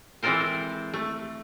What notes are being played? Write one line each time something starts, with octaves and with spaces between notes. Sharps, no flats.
E3 G#3 C4 A4 A#4 C5
A3